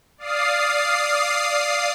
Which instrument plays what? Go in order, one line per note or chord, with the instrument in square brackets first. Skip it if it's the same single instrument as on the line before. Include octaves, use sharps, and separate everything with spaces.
[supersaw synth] D5 F5 D#6 C7